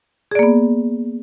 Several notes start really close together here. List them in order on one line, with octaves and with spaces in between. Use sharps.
G#4 D5 A#3 B3